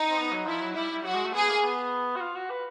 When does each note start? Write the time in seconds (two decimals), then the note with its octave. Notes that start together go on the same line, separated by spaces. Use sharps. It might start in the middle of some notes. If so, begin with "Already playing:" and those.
Already playing: D#4
0.10 C4
0.18 B3
0.32 F#3
0.46 F3 E4
0.61 F#3
0.75 G3 E4
0.91 G3
1.04 F#3 F#4
1.14 G#3
1.25 A3
1.34 B3 G#4
1.48 A#3
1.63 B3
2.16 F#4
2.20 F4
2.36 F#4
2.50 B4